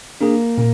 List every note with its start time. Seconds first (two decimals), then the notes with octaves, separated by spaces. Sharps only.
0.21 A#3 D4 G#4
0.58 A#2 A#3